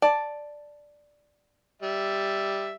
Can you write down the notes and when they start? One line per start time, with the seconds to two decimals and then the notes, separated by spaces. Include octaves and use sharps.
0.02 D5 A5
1.82 G3 E5